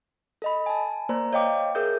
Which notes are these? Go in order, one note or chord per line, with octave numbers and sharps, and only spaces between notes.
A4 D#5 B5
G#5 A5
A#3 C5 D5 A#5
C#5 D#5 F5 G5 D6
G#4 A#4 C#5 E5 D#6 G6